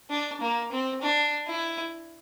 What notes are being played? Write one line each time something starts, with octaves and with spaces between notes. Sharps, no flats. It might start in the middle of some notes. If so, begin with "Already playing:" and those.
D4
A#3
C4
D4
E4